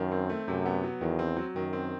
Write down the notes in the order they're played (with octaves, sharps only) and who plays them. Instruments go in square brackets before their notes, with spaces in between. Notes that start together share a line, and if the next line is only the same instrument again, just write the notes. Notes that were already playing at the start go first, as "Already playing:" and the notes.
Already playing: [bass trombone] F#2 [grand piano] D#3
[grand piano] C4
A3
[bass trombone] F#2 [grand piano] C3
[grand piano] B3
F#3
[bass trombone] E2 [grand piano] D#3
[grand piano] C4
F#3
[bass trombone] F#2 [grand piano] D#3
[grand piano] C4